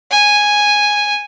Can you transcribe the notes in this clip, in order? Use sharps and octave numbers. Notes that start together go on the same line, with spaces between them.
G#5